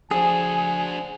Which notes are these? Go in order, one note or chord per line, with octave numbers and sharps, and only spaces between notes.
F3 D4 F#4 G#4 G#5